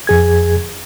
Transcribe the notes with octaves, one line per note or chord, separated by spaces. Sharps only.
F2 G#4 G#6